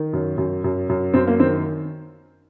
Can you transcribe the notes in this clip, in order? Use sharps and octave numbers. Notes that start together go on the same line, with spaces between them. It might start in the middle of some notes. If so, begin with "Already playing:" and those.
Already playing: D#3
F#2
F#2
F#2
F#2
F#2 C4
A#3
D#3 C4